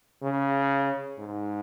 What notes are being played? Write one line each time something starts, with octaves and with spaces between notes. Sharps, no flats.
C#3
G#2